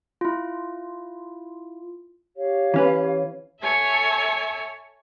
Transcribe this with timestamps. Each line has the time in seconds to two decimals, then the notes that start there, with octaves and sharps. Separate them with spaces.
0.21 E4 F4
2.36 G4 C#5 F5
2.74 E3 C#4 B4
3.61 A4 C#5 E5 G#5